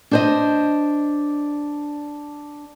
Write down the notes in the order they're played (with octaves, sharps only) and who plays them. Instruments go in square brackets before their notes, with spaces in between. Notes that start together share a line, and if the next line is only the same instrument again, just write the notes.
[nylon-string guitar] D4 C5 D#5